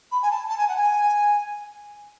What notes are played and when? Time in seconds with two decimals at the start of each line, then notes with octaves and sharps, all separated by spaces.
0.12 B5
0.22 G#5
0.31 A5
0.49 A5
0.58 G#5
0.68 F#5
0.77 G#5